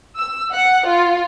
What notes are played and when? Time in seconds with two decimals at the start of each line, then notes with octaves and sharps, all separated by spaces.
0.17 E6
0.54 F#5
0.89 F4